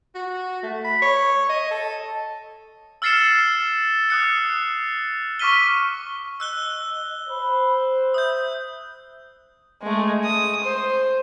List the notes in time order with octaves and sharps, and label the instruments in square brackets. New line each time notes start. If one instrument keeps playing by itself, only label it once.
[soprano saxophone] F#4
A3
B5
C#5
D#5
A4
[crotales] E6 F6 A6 C7 C#7 E7
D#6 F#6 C#7
C#6 D6 F6 B6 D#7 G7
[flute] C#6
[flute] D#5 [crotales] E6 F#6 G7
[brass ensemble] C5 [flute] B5
[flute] E5 [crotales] D#6 G6
[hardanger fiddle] G#3 A3
D#6
C5